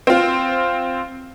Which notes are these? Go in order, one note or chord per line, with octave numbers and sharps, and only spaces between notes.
C4 F4